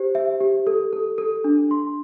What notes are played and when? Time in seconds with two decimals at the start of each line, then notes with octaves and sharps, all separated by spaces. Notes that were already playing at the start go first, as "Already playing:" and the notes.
Already playing: G4 C5
0.15 E5
0.41 G4
0.67 A4
0.93 A4
1.18 A4
1.44 D4
1.71 C6